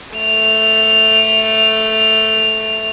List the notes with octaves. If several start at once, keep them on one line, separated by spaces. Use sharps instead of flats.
A3 F7